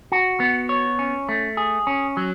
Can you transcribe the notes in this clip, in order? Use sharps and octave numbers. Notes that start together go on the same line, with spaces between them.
F#4
B3
C#5
C#4
A3
G#4
C#4
F#3